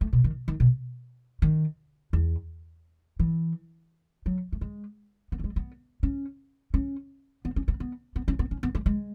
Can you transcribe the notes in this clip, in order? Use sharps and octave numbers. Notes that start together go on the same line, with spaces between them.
A3
B2
D#3
D#3
B2
D#3
E2
E3
F#3
A3
G#3
B3
A3
G#3
B3
C#4
C#4
B3
C#4
B3
B3
B3
C#4
B3
C#4
B3
A3
G#3